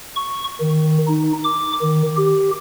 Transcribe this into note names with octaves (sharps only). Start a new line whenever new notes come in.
C#6
D#3
D#4
D6
D#3
G4